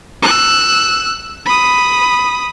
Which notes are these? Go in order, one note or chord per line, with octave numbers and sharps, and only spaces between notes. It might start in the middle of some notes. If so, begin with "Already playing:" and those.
E6 F#6
B5 D#6